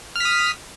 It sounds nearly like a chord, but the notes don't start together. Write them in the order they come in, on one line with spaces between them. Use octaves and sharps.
F6 B6 D#6